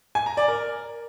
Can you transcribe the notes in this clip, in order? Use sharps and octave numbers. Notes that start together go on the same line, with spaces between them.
G#5
A#5
D5
A#4